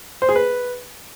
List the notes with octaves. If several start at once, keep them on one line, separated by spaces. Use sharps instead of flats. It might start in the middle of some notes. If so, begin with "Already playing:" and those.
C5
G#4
B4